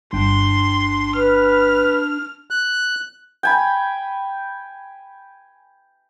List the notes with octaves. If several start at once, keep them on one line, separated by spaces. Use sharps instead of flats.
G1 D4 G5 C6
B4 F6
F#6
G5 G#5 B5